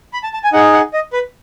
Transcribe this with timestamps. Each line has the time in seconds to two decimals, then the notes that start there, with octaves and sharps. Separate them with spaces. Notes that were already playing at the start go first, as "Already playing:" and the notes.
0.13 B5
0.23 A5
0.34 A5
0.44 G#5
0.53 D#4 G#4 F#5
0.73 F#5
0.94 D#5
1.13 B4